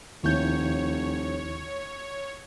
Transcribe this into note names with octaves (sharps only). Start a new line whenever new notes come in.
F1 D#2 E4 C#5 G6